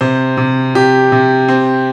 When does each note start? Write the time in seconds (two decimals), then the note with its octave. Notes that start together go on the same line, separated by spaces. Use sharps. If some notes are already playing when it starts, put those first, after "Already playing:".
0.01 C3 C5
0.37 C3
0.75 C3 G4
1.12 C3
1.49 C4